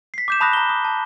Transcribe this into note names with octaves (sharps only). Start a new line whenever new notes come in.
B6 C7
D6 G6 E7
A5 B5 D#6 F#6 A#6
A#5 G7
D#6
A5